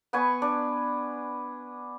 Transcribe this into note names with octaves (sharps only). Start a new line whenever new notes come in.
B3 B4 G#5 C#6
D4